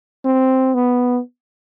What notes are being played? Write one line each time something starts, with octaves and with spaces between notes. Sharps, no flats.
C4
B3